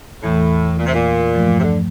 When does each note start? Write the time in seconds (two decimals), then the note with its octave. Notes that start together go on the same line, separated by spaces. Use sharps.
0.23 E2 A2 E3 A3
0.79 A#2
0.86 C3
0.93 A#2
1.35 G2 F3 A3
1.59 C3
1.63 D3